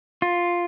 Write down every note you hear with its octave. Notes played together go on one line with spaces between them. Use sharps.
F4